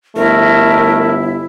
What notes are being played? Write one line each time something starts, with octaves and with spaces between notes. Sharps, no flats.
G1 A3 E4 A#4